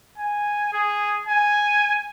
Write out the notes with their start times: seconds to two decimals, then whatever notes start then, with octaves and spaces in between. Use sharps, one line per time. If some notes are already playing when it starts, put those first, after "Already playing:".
0.18 G#5
0.73 G#4
1.27 G#5